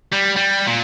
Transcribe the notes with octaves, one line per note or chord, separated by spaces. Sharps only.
G3
G3
A#2